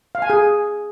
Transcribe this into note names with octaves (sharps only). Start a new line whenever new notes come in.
F5
G#5
G#4